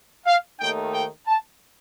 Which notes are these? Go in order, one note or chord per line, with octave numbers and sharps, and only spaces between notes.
F5
D#2 D#3 A3 D#4 G5
G5
A5